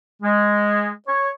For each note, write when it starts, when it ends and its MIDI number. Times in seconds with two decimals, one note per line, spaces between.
0.22 0.90 56
1.08 1.30 73